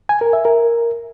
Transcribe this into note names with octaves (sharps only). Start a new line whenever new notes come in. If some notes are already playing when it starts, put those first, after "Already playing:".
G#5
A#4
E5
A#4